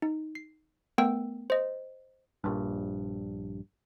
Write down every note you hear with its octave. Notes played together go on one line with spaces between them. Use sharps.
D#4
C7
A3 B3 A#4 G5 E6
C5 D#5
A#1 G2